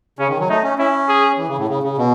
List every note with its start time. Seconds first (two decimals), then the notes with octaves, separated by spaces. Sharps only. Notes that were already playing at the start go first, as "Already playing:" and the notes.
0.19 C#3 C#4
0.29 D#3
0.40 F#3
0.49 A3 D#4
0.64 C#4
0.78 C#4 E4
1.08 G#4
1.38 E3
1.48 C#3
1.58 A2
1.68 C#3
1.83 C#3
1.98 B2